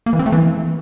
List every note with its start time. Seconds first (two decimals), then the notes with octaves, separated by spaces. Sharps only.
0.06 A#3
0.13 E3
0.19 C4
0.26 A3
0.32 E3